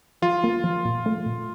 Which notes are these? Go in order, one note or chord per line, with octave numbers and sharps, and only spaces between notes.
F3 F4
A#3
F3
A#2
A3
A#2